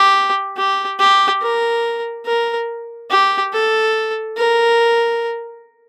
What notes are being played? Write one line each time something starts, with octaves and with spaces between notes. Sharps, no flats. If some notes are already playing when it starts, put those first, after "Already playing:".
Already playing: G4
G4
G4
A#4
A#4
G4
A4
A#4